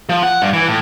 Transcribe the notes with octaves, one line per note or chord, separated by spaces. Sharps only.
F3
F#5
G2
E3
A2